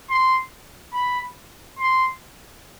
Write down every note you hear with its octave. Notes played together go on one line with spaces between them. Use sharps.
C6
B5
C6